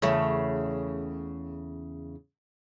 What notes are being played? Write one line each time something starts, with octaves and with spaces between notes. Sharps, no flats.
E2 C#3 A3